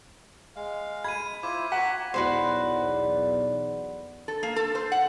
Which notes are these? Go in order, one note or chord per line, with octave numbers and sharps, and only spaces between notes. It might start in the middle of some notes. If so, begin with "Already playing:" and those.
G#3 F5
B5 G#6 D#7
E4 F4 C5 D6
F#4 F#5 A#5 D6 B6
B1 E2 F#4 B4 C5 D5
A4
A#3
A4
C5
F#5